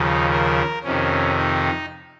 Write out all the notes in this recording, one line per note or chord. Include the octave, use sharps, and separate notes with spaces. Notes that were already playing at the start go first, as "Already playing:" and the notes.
Already playing: D#2 C#3 F3 D#4
A#4
F2 C3 D#3 C#4
D#4